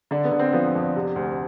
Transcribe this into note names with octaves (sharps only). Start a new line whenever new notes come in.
D3 D4
B3
D3
C4
F3 B3
C4
F2
D4
C3
D2